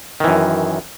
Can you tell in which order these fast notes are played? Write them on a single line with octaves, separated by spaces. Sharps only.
D#3 E3 F#2